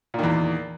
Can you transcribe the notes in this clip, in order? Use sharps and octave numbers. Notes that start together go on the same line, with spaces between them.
E2 A#2 D#3